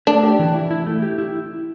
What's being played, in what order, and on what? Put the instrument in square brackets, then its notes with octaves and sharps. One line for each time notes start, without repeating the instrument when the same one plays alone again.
[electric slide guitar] A3 [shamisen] D4
[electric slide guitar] G4
E3
E4
E4
A3
G4
E4